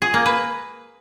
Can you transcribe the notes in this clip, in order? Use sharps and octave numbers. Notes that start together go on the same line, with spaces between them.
G#4
A#3
B4